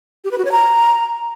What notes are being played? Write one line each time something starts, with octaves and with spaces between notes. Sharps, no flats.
G4
B4
F#4
C#5
A#5